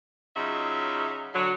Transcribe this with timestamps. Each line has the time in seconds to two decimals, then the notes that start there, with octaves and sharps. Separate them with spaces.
0.37 C#3 F#3 D#4 F4 E5
1.34 D3 F#3